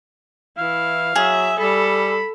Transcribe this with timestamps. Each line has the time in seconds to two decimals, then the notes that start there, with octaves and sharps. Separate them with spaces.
0.58 E3 E4 F5
1.16 F#3 G#4 E5
1.60 G3 A4 B5